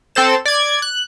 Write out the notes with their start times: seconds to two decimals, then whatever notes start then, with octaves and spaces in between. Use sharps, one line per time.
0.15 C4 A4 C5 E7
0.46 D5 G#6
0.82 F#6